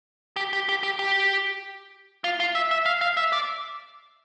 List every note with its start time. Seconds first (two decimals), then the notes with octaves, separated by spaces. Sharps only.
0.36 G4
0.53 G4
0.69 G4
0.83 G4
0.99 G4
2.24 F4
2.40 F4
2.55 E5
2.71 E5
2.86 F5
3.01 F5
3.17 E5
3.33 D5